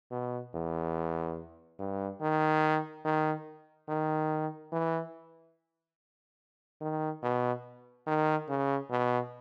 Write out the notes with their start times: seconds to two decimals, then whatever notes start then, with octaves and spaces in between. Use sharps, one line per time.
0.11 B2
0.54 E2
1.79 G2
2.21 D#3
3.04 D#3
3.88 D#3
4.72 E3
6.81 D#3
7.23 B2
8.07 D#3
8.49 C#3
8.90 B2